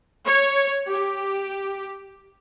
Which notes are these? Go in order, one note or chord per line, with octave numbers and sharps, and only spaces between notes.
C#5
G4